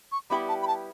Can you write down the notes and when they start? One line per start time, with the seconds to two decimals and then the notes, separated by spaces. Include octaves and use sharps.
0.12 C#6
0.30 G3 B3 E4 G4 B5
0.49 A5
0.62 B5
0.67 A5